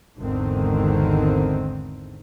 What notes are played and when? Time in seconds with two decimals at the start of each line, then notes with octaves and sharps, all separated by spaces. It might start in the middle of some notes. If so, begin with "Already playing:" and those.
0.20 G#1 E2 D3 D#3 C4